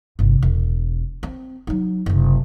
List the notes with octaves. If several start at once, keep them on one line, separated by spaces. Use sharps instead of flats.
G1 C3
E1
C4
F#3 D#4
F#1 C3